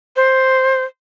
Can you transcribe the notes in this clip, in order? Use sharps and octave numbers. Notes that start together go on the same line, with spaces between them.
C5